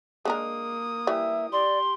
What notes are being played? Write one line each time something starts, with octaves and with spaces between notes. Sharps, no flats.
G#3 A#3 D4 A#4 D#6
E3 G3 E5
G4 D5 C6